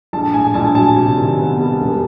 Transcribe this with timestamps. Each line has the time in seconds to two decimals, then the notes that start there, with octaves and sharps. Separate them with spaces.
0.13 A#1 A5
0.34 A2 G#5
0.54 A#1 A5
0.75 F#3 A5
0.97 C3
1.18 D#3
1.38 B3
1.59 G3
1.80 E1